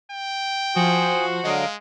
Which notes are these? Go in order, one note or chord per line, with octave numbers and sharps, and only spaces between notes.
G5
F3 F#4 C5 G#5 D#6
D3 F#3 G#3 D#5 F5 D7